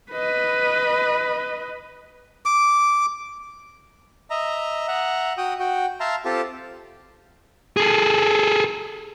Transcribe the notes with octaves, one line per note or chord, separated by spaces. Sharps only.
B4 D#5
D6
D#5 E5 A#5
E5 F#5 A#5
F#4 G5 D#6
F#4 G5
E5 F5 A5 A#5 C6
C4 F4 G4 A4 A5
G#4 A4